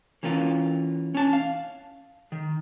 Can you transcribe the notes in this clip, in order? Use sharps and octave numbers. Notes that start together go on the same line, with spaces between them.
E3 A#3 C#4 F4
C#4 A5
F5
D#3